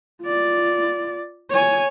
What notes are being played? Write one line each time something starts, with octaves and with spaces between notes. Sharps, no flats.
F4 D5
C#5 G#5